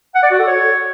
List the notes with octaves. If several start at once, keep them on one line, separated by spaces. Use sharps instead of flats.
F#5
D5
F#4
A4
C#5